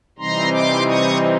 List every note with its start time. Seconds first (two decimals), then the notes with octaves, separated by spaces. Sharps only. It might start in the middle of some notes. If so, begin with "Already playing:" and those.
0.18 C3 E3 G3 C4 D#4 A#5 C6
0.52 C6 D6
0.87 C#6 D#6